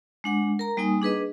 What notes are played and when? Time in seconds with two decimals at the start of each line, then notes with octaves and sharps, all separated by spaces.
0.24 G#3 D4 F#5
0.59 A#4 A#5
0.77 G3 A#3 D#4 G#5 D#6
1.01 D4 G#4 B4 D#5